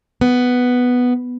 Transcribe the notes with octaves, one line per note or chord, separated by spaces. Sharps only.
B3